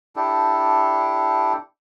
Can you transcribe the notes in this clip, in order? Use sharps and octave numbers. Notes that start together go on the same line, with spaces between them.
D4 E4 G4 A4